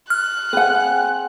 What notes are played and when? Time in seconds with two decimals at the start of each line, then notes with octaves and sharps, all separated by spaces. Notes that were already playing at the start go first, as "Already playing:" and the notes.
0.10 F6 F#6
0.53 C4 G#4 B4 F#5 G#5